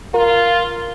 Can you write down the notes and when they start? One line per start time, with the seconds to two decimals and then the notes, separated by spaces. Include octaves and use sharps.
0.14 F4 A#4